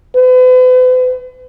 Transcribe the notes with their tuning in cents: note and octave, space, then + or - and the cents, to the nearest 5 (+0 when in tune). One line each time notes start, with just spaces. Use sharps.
B4 +45